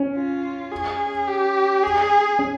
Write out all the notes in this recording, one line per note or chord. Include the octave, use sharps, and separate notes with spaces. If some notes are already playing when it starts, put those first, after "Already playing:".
Already playing: C#4
F4
G#4
G4
G#4
C#4